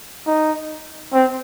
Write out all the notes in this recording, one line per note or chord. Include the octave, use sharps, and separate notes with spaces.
D#4
C4